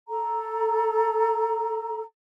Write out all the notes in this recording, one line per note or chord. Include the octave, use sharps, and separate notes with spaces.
A4 A#5